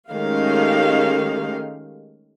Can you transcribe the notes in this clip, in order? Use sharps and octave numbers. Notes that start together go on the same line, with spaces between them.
D#3 G#3 A3 C#4 G4 F5